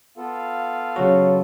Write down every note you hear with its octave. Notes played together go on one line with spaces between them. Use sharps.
B3 F4 A4 F5
C#3 F#3 F#4 C#5